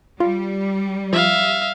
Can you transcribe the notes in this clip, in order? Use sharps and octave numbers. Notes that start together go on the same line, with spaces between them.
G3 F4
F3 E5 F5